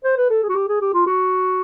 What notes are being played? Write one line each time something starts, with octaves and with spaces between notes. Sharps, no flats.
C5
B4
A4
G#4
F#4
G4
G#4
G4
F4
F#4